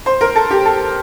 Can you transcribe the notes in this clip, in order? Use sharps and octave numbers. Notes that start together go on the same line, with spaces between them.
C5
A#4
A4
G4
A4